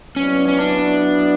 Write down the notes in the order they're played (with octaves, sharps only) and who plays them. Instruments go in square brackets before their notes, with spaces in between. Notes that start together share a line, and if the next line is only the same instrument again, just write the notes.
[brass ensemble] F#3 B3 E4 B4 D5 [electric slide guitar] C#4
[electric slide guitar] C#4
D4